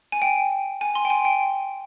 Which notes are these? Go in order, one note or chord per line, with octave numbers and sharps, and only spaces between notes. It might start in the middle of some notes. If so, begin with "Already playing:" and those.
G#5
G5
G#5
C6
G5
G#5
G5